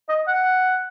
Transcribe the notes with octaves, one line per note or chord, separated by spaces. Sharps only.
D#5
F#5